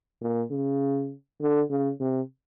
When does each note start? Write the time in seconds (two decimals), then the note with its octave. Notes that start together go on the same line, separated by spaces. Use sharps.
0.22 A#2
0.51 C#3
1.41 D3
1.70 C#3
2.00 C3